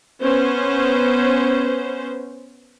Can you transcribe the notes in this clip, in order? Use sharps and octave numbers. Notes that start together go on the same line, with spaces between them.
B3 C#4 C5